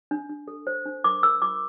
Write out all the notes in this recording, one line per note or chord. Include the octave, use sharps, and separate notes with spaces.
D4
D4
A4
C5
D4
A#4 D6
A#4 E6
F4 D6